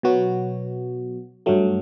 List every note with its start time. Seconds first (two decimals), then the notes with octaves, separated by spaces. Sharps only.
0.03 B2 F#3 B3 F#4
1.46 G2 F#3 A3